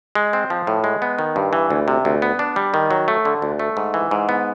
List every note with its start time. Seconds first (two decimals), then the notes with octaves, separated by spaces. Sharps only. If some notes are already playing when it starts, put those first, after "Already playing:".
0.15 G#3
0.33 C4
0.50 F3
0.67 A2
0.84 G#3
1.02 B3
1.19 D#3
1.36 G2
1.53 E3
1.70 D2
1.88 C3
2.05 D2
2.22 B3
2.39 D4
2.56 G3
2.74 D#3
2.91 F#3
3.08 A3
3.25 D3
3.42 D2
3.59 A3
3.77 G#2
3.94 E3
4.11 G#2
4.29 B3